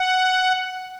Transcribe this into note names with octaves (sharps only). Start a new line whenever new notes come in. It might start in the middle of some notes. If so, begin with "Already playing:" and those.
Already playing: F#5